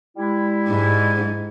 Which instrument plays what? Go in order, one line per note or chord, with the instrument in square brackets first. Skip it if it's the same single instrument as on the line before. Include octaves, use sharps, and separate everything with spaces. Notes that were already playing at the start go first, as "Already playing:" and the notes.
[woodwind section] G3 G#3 E4
[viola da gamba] G#2